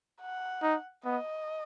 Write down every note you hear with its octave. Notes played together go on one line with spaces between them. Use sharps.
F#5
D#4
B3 D#5